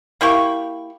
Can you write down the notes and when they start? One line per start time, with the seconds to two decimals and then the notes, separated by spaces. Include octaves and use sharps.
0.21 A#3 E4 G4 C#6